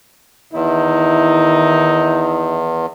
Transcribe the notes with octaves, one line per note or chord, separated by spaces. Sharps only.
E2 D#3 D#4 E4